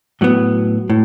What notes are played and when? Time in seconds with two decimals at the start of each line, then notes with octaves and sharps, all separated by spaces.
0.21 A2 F#3 B3
0.90 A2